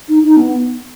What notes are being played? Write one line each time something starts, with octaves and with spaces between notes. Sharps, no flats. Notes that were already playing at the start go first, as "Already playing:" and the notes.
D#4
D#4
B3